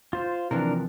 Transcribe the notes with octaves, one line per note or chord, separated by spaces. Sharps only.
F4 C5
C3 E3 F3 D4 A#4